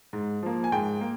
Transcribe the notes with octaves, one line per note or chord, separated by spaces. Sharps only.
G#2
F3 A#3
G#5
G#2 G5
A#3